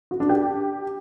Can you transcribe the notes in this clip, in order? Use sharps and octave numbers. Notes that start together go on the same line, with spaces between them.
F#4
D4
G4